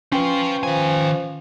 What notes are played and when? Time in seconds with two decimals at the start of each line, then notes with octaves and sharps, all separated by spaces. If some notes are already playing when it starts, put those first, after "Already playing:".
0.12 C#4 F4 B4 C5 G5 C#6
0.63 D#3 F3 G#5